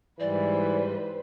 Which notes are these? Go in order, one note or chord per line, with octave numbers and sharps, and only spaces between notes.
G#2 E3 G3 B4 C5 D5